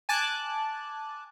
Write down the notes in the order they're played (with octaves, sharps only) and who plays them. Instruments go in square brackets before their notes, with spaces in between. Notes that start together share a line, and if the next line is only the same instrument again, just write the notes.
[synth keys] G#5 A5 D6 F#6